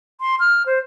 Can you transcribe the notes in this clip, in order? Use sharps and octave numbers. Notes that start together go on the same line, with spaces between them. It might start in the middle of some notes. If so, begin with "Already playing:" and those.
C6
F6
C5